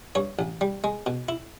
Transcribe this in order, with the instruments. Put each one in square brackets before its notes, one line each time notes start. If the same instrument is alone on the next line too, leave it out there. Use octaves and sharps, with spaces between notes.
[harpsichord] G2 C#5
A1
G3
G#3
B2
E4